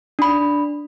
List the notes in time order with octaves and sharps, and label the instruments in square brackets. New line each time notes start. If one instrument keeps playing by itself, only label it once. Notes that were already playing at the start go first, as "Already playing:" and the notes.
[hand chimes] D4 B5